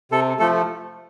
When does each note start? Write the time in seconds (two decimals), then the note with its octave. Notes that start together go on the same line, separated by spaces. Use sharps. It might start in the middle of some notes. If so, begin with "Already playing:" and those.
0.11 C3 A4
0.39 F3 A3 A4